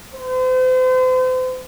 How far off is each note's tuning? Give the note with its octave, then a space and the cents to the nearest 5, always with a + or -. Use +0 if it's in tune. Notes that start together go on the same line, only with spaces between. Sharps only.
C5 -40